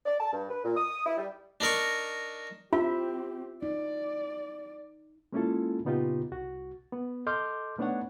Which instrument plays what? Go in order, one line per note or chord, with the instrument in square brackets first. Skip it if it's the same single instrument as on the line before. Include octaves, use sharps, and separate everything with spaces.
[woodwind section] D5
A5
G2
B4
A#2
D#6
E4
G3
[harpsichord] D4 D#4 A#4 C#6
[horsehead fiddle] C4 G4 [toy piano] F4 [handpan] E5
[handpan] D#4 [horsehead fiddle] D5
[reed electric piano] G#3 A#3 C#4 E4 F4 A4
A#2 C#3 B3 D#4 F4 G4
C2 F#4
B3
A4 D#5 C6 D6 F6 G6
A3 B3 D4 D#4 C#5 F#5